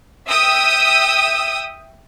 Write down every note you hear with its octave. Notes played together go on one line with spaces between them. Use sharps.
E5 G5 D#6 E6